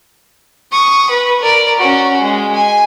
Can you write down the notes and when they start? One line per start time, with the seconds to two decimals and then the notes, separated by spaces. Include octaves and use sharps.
0.72 C#6 D#6
1.10 B4
1.42 A#4 D5
1.78 C#4 F#4
2.21 G#3
2.55 G#5